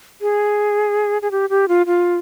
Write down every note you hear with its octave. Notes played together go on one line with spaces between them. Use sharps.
G#4
G#4
G4
G4
F4
F4